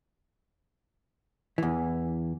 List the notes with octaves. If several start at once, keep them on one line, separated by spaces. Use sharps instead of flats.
E2 E3